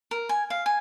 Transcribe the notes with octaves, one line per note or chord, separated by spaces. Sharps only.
A#4
G#5
F5
G#5